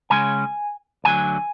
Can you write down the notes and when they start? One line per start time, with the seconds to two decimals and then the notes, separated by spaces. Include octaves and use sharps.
0.10 C#3 G#3 C#4 G#5
1.04 D2 D3 F#3 G#5